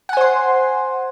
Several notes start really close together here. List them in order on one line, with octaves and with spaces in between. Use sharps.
F#5 G#5 C5 C6